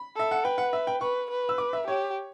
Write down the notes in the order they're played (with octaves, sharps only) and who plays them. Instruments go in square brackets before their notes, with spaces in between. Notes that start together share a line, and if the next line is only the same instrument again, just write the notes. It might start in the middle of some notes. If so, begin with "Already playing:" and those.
Already playing: [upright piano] B5
[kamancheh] A4 [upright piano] E5
[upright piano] F#5
[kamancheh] B4 [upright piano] G5
[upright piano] F#5
E5
G5
[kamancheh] B4 [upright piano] C#6
[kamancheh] B4
[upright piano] E6
D6
E5
[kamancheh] G4 [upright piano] C#5